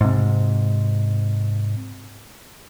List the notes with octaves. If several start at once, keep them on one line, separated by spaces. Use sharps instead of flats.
G#2 C3